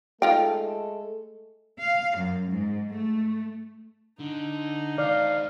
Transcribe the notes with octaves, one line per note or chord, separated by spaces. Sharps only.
G#3 A3 D#4 F4 A4 G5
F5
F#2
G#2
A3
D3 D#4
D#3 C5 D5 F5